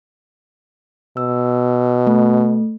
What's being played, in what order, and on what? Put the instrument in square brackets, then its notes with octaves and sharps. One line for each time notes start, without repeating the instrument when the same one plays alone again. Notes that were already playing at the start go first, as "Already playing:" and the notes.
[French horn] B2 [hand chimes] E6
[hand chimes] A3